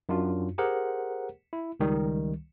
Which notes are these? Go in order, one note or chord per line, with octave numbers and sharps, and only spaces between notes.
F#2 D4 F4 F#4
G4 G#4 A#4 C5 F#5
E4
C#2 D#3 G3